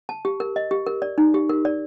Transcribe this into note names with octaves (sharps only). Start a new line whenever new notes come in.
A5
G4
A#4
D#5
G4
A#4
D5
D#4
G4
A#4
D5